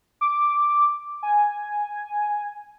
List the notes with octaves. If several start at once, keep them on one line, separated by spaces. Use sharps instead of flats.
D6
G#5